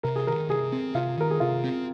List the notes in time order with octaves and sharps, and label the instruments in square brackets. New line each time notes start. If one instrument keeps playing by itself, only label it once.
[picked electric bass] C3 [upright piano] A#4
[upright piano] G#4
[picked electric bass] D#3 [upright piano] A#4
[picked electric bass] C3 [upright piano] G#4
[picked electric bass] C4
[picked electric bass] C3 [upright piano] F4
[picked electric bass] D#3 [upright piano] A#4
[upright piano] G#4
[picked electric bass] C3 [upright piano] F4
[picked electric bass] C4